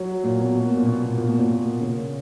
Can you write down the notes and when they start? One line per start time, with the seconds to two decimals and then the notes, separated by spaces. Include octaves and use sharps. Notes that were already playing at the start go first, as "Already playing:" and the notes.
Already playing: F#3
0.24 A#2
0.39 B2
0.55 B2
0.76 A#2
0.86 B2
1.02 B2
1.18 A#2
1.28 B2
1.39 A#2
1.49 B2
1.81 C#3